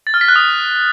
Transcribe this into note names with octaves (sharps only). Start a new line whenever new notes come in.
A6
F6
B6
F#6
D#6